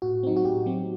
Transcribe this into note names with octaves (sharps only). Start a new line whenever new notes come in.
A2 F#4
F#3 C4 D#4
F#4
A2 G4
F#3 C4